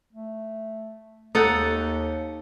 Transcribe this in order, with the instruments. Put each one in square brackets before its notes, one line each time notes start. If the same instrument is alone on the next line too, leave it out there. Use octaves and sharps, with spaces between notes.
[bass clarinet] A3
[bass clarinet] D#2 [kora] D#4 A4 F#5